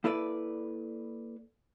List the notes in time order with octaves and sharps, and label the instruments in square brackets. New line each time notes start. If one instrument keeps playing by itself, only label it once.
[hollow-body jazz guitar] A#3 E4 A4 B4 D5